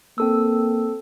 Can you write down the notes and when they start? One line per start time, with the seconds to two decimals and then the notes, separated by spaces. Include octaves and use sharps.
0.18 A#3 C4 A4 E6